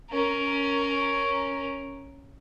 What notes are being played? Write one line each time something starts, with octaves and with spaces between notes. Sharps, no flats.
C#4 A#4